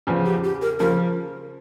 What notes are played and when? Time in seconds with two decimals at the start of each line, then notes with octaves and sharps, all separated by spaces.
0.07 E2 C#3 F3
0.25 G4
0.44 G4
0.62 A#4
0.80 C#3 F3 A#4